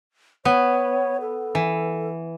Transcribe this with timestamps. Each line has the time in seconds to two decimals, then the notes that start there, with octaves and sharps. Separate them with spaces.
0.45 B3 C#5
1.21 A4
1.55 E3